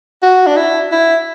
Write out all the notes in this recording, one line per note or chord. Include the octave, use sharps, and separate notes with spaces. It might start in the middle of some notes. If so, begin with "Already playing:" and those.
F#4
D4
E4
E4